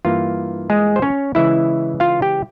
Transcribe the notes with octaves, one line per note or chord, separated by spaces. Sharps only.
G2 E3 A#3 F4
G#3 G#4
C5
C#4 C#5
C#3 E3 G#3 E4 E5
F4 F5
G4 G5